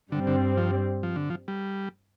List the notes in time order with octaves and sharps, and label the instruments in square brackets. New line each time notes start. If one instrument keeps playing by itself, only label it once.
[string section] G2 G3 C4 [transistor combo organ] D3
[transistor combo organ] D3
F3
F3
D3
F3
G3